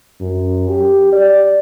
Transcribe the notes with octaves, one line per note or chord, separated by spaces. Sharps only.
F#2
G4
D5